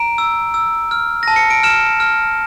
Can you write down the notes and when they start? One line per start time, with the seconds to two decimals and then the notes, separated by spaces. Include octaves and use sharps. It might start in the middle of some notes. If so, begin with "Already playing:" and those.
Already playing: A#5 D7
0.18 E6
0.54 E6
0.91 F6
1.23 A5 A#6
1.36 C#7
1.50 D7
1.63 F6 E7
2.00 F6